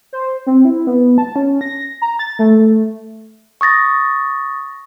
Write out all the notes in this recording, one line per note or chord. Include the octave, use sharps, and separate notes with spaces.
C5
C4
E4
B3
A5
C#4
A#6
A#5
A6
A3
A3
C#6 D#6 A6 A#6